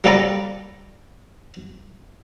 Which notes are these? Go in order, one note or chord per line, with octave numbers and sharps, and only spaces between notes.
G3 A#3 C#4 A4 D5 A#5